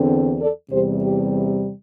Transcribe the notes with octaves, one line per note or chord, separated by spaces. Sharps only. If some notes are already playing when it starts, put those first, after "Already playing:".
Already playing: E2 D3 C4
A4 D5
E2 C3 G3 G4 C5
G4